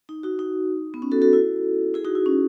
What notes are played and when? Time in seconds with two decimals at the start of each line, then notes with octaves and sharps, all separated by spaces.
0.09 D#4
0.23 D#4 F#4
0.39 D#4
0.94 B3
1.02 C#4
1.12 F#4 A4
1.22 F#4 A4
1.33 E4
1.94 E4 G#4
2.05 D#4 F#4
2.15 E4
2.26 C#4